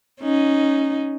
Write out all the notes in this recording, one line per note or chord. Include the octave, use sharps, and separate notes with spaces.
C#4 D#4